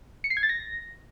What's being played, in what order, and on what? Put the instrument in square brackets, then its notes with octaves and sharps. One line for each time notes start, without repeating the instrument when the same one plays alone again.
[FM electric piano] C#7
C7
G#6
A6
A#6